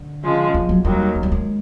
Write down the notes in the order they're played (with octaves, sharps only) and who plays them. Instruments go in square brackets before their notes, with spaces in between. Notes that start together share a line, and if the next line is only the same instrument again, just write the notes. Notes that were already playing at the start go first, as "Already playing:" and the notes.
Already playing: [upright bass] D3
[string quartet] C#3 F3 G#3
[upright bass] F3
F#3
[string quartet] D#2 D#3 F#3 [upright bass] G3
[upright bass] G#3
G3
G#3